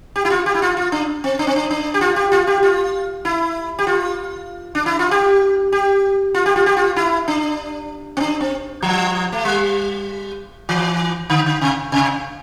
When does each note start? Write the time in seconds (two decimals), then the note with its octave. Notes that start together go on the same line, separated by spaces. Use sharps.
0.16 G4
0.25 E4
0.30 F4
0.46 G4
0.54 E4
0.62 F4
0.77 F4
0.92 D4
1.24 C4
1.39 D4
1.47 C4
1.56 D4
1.71 D4
1.94 G4
2.01 F4
2.16 G4
2.32 F4
2.47 G4
2.63 F4
3.25 E4
3.79 G4
3.87 F4
4.75 D4
4.86 E4
4.99 F4
5.11 G4
5.72 G4
6.34 F4
6.46 G4
6.56 F4
6.66 G4
6.77 F4
6.96 E4
7.28 D4
8.17 C4
8.20 D4
8.40 C4
8.82 F3
9.32 A3
9.45 G3
10.69 E3
11.30 D3
11.46 D3
11.61 C3
11.92 C3